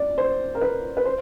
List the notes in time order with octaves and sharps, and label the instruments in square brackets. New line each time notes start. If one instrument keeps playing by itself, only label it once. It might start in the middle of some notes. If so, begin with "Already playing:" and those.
Already playing: [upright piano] D5
C5
A#4
B4
B4
C5